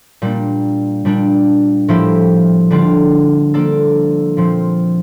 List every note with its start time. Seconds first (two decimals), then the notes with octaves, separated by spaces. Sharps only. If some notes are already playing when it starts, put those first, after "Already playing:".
0.22 A#2 G3 A#3 D4
1.05 A#2 G3 D4
1.88 A2 F3 A#3 E4 G4
2.70 D3 G3 D4 F4
3.54 F3 A#3 D4 A4 D5
4.37 A#2 F3 C4